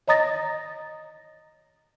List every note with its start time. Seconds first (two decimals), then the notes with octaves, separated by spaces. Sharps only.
0.08 C#5 D#5 A#5 D#6 A6 A#6